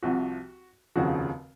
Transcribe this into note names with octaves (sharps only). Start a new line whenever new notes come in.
C2 C3 F3 F#4
F1 D#2 C#3 F3 F#4